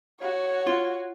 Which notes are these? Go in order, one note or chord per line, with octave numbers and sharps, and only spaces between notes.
F#4 C#5
F4